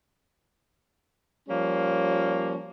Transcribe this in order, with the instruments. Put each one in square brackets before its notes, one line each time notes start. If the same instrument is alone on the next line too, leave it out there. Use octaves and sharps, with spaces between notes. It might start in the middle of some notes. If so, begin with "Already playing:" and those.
[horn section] F3 G3 A#3 C#4